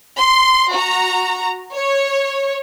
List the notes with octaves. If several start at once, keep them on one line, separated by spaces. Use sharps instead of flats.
C6
F#4 A#5
C#5